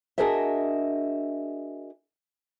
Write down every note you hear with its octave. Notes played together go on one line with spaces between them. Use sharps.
D4 F#4 G#4 A#4 D#5 E5